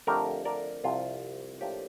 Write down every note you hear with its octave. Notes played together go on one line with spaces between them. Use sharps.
F2 D3 A3 D4 G4 A#4
A#4 D5
C2 C3 F3 F4
A2 F3 A#3 D4 G4